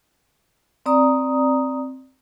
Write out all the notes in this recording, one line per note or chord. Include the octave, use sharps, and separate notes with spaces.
C4 D5 A#5 D#6